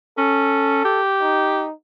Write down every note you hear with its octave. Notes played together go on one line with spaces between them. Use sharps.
C#4 A4
G4
D#4